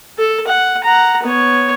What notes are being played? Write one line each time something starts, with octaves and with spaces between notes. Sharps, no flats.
A4
F#5
F#5 A#5
B3 C#5